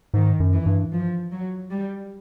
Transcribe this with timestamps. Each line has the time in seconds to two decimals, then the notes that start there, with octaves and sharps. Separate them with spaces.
0.14 G#2 D#3
0.40 F#2
0.53 E3
0.66 G2
0.93 F3
1.31 F#3
1.71 G3